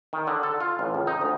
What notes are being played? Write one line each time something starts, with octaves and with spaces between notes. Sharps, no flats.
D#3
D3
A4
F4
A1
C#2
D#4
D2